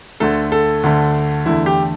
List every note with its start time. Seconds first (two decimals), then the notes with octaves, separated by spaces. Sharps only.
0.20 D2 D3 A3 A4
0.52 A4
0.83 D2 D3 A3
1.46 E2 D3 A3 E4
1.66 G4